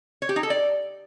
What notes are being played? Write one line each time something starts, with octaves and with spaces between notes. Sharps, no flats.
C#5
G4
D#4
A4
D5